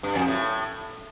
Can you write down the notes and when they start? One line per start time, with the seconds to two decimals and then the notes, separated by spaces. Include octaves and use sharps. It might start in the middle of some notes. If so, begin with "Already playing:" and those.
0.03 G2
0.15 F2
0.27 A2